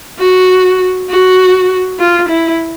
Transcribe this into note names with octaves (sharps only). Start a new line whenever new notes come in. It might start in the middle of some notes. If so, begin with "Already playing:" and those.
F#4
F#4
F4
E4